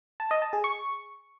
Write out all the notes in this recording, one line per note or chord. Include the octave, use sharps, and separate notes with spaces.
A5
D#5
A5
G#4
C#6